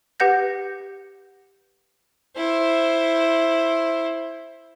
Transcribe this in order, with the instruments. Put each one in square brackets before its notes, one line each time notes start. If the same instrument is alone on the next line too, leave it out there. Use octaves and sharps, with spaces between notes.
[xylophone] G4 B4 F#5 G6 A#6
[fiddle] E4 C5